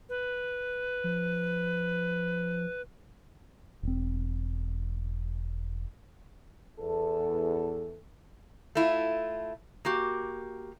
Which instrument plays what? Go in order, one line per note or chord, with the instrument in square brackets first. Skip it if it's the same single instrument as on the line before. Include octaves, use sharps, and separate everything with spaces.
[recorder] B4
[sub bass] F3
[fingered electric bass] E1 C4
[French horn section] E2 A4
[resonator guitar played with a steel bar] A3 E4 F4
A#3 F#4 G4